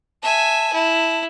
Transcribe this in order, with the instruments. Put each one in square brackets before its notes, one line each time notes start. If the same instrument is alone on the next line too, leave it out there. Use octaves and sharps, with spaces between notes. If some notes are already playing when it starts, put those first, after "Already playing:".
[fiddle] E5 G#5 [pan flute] A5
[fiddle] E4